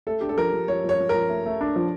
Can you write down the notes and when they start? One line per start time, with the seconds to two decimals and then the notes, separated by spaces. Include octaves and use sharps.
0.07 A3 A4
0.20 D4 G4
0.29 A4
0.37 F3 A#4
0.53 F3
0.68 F3 C#5
0.84 F3
0.89 C#5
0.99 F3
1.09 F3 A#4
1.29 A3
1.46 A3
1.61 D4
1.76 F3